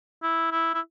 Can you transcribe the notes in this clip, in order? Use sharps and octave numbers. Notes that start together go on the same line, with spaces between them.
E4
E4
E4